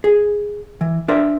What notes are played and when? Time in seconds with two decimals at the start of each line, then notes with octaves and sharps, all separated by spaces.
0.04 G#4
0.81 E3
1.08 D4 A#4 C5 D5 E5